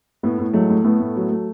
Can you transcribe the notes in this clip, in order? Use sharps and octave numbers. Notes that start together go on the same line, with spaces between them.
A2 A3 B3
A2
F#3 G#3 A3
A2
A2 A3 B3
A2
F#3
A3